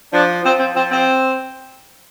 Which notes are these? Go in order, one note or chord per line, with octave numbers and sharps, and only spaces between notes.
F3 D4
F3 C4
C4
F3 C4
C4